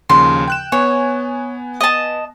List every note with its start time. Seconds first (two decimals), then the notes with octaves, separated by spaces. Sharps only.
0.09 D#2 C#3 F3 C6
0.48 G5 F#6 E7
0.72 B3 C#5 G#5
1.81 D#5 A5